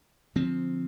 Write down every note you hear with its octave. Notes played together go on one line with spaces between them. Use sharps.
D3 F3 C4